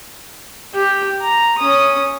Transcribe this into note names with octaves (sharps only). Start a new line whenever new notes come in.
G4
A#5
C#4 D#6